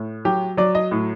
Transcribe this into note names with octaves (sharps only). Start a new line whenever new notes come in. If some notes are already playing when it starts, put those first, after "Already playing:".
Already playing: A2
F#3 G4
F#3 D5
D#5
A2